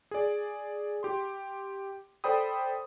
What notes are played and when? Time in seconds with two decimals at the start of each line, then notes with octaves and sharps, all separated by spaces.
0.11 G#4 D5
1.03 G4 C6
2.24 A4 C5 D5 G5 B5 D#6